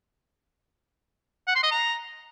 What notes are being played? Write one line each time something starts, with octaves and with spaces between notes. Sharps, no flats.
F#5
C6
D#5
A#5